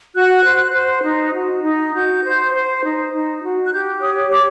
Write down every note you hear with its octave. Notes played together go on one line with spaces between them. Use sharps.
F#4 F#6
C5
C5
D#4
F#4
D#4
F#4 G6
C5
C5
D#4
D#4
F#4
F#6
G4 G6
C#5 D#6
C#5 D6